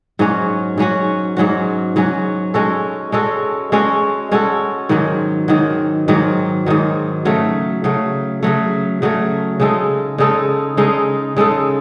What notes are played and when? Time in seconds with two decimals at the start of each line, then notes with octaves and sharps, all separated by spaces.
0.19 G#2 F#3 C#4 F#4
0.78 G#2 F#3 C#4 F#4
1.37 G#2 F#3 C#4 F#4
1.96 G#2 F#3 C#4 F#4
2.54 G#3 C#4 F#4 A4
3.12 G#3 C#4 F#4 A4
3.72 G#3 C#4 F#4 A4
4.31 G#3 C#4 F#4 A4
4.89 G#2 D#3 F#3
5.48 G#2 D#3 F#3
6.08 G#2 D#3 F#3
6.66 G#2 D#3 F#3
7.25 C#3 F#3 A3
7.84 C#3 F#3 A3
8.43 C#3 F#3 A3
9.02 C#3 F#3 A3
9.60 C#3 G#3 D#4 A4
10.18 C#3 G#3 D#4 A4
10.77 C#3 G#3 D#4 A4
11.37 C#3 G#3 D#4 A4